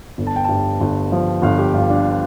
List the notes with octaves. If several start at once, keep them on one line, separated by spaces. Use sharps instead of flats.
G1
A5
G5
G2 A5
G1
F3
G1 F5
G4
G2 F4
D4